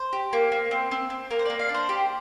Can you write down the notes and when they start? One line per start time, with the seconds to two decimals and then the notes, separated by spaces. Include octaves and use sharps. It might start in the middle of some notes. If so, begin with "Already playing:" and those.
Already playing: C5
0.13 G4
0.33 A#3
0.52 A#3
0.71 C4
0.91 C4
1.10 C4
1.31 A#3 A#4
1.39 C5
1.45 A#3 D5
1.59 F5
1.69 D4
1.74 C5
1.89 G4